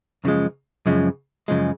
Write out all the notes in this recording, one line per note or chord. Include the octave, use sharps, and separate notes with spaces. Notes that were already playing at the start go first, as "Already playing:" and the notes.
F#2 C#3 F3 G#3
F#2 C#3 F3 G#3
F#2 C#3 F3 G#3